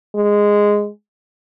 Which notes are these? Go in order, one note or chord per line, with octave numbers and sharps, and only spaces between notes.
G#3